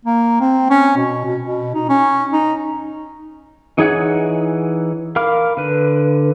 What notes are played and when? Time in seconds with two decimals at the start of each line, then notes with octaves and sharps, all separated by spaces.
0.05 A#3
0.41 C4
0.70 C#4
0.97 B2
1.25 B2
1.43 B2
1.75 D#4
1.89 C#4
2.33 D#4
3.77 E3 D#4 G#4 C#5 F#5
5.16 A#4 F5 B5 D6 F6
5.57 D3 B4